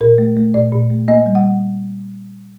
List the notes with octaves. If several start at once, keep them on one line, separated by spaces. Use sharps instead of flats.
A#2 A#4
A3
A3
A#2 D5
A#2
A3
A#3 D#5
G3
F#5